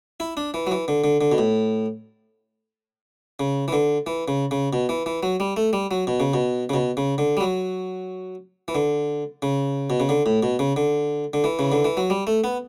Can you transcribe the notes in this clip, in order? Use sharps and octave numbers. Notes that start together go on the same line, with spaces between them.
E4
D4
E3
F#3
E3
D3
D3
D3
B2
A2
C#3
E3
D3
E3
C#3
C#3
B2
E3
E3
F#3
G3
A3
G3
F#3
B2
C#3
B2
C#3
B2
C#3
D3
G3
F#3
E3
D3
C#3
B2
C#3
D3
A2
B2
C#3
D3
D3
E3
C#3
D3
E3
F#3
G3
A3
B3